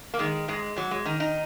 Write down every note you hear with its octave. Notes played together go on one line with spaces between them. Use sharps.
A#3
D#3 G#3
G#2 G#3
G#2 F#3
G#3
D#3 D#4
D#4